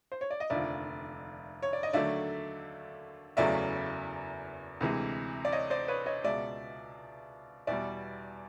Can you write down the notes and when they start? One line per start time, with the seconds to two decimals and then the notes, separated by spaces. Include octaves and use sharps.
0.12 C5
0.21 C#5
0.31 D5
0.40 D#5
0.50 F1 D#2 D3 F3 D5 E5
1.62 C#5
1.73 D5
1.83 D#5
1.93 D#2 D3 F#3 A3 D5 E5
3.37 F#1 E2 C#3 F#3 A3 D5 E5
4.81 D2 C3 E3 G#3
5.45 D5
5.52 C#5 D#5
5.70 C5 D5
5.88 B4 C#5
6.06 C#5 D#5
6.24 C#2 B2 G#3 D5 E5
7.67 E2 B2 G3 D5 E5